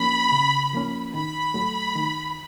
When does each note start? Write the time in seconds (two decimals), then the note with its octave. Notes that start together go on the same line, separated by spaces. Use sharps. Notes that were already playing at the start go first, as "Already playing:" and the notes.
Already playing: F3 A#3 C#4 B5
0.32 C#3
0.73 F3 A#3 C#4
1.14 D#3 B5
1.54 F#3 A3
1.96 D#3